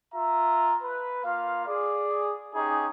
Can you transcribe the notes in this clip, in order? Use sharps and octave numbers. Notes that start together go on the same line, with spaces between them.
F4 E5 A#5
B4
A#3 F4 F5
G#4 D5
C#4 D#4 G4 G#4